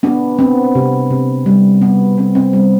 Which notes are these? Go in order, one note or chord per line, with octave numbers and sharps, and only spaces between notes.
B3 D4
B3 C4
C3
C3
G3
B3
B3 C4
C4
G3 B3